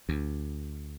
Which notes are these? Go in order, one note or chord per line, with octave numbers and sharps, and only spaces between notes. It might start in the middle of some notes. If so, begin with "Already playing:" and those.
D2